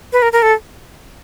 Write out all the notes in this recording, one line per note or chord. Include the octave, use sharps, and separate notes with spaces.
B4
A#4
A#4
A4